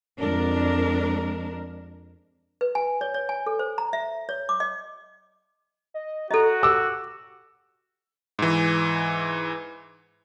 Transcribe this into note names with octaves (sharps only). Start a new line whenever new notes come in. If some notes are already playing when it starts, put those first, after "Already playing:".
F2 G#3 D4 A#4
B4
G#5
C#5
C#5
G#5
A4
C5
A#5
E5
C#5
D6
D#5
D#5
F#4 A4 D#5 A#5
G4 D6 E6
G#2 E3